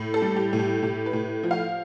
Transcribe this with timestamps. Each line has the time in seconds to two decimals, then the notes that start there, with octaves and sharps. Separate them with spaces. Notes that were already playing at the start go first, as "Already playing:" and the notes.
Already playing: A2
0.14 A4
0.22 G3
0.36 G4
0.53 A2
0.59 G4
0.82 A2 G4
1.06 B4
1.13 A2
1.43 F3
1.51 F5